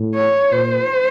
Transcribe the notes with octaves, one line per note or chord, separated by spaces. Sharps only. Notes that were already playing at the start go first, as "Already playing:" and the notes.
Already playing: A2
C#5
A#2 C5